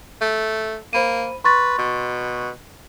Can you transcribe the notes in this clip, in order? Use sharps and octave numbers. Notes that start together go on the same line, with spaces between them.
A3
A#3 C5 B5 D#7
B4 C6 C#6 A6
B2